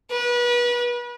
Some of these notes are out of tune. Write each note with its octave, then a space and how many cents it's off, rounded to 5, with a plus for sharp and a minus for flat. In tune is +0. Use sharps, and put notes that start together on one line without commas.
B4 -35